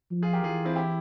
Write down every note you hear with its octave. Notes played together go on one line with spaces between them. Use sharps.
F3
F4 G#4
G4 A#4
E3 F4 G#4
C4 E4
E4 G4